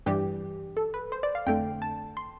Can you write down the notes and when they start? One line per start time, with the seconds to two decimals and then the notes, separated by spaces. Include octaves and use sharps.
0.06 G2 E3 G3 G4
0.77 A4
0.94 B4
1.12 C5
1.23 D5
1.35 F5
1.47 F2 D3 A3 G5
1.82 A5
2.17 C6